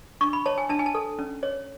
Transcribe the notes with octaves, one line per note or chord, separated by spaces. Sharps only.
D4 C#6
B5
C#5 A5
G#5
D4 A5
G#5
A5
A4
C#4
C#5